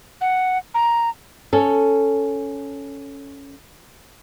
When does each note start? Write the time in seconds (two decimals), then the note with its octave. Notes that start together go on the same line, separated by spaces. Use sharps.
0.21 F#5
0.74 A#5
1.53 C#4 A4